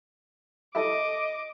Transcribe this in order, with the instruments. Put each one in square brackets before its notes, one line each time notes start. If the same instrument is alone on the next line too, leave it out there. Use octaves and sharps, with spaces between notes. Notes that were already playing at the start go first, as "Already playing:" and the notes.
[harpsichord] E4 G4 A4 [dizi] D#5 [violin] D6